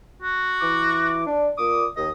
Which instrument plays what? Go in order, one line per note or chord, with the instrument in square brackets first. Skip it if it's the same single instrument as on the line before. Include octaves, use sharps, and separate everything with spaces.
[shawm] F#4
[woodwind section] E3 D6
D4
[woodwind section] A#2 D6 [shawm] D#6
[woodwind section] D#2 [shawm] D#5